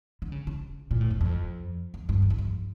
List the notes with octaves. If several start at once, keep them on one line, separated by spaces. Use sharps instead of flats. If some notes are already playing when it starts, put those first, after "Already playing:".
D3
C#3
C#3
A#2
A2
F2
F2
F2
G2
E2
F2
G2